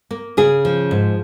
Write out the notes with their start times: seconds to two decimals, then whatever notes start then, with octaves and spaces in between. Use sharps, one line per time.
0.11 A#3
0.37 C#3 G#4
0.65 F3
0.91 G#2